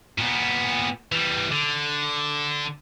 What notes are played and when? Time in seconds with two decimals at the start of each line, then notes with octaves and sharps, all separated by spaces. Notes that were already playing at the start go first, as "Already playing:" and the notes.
0.18 A#2 B3
1.12 E3 G3
1.52 D3